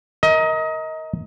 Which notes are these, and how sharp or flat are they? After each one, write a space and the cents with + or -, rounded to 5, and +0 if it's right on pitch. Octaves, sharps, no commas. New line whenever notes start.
A#4 +0 D#5 +25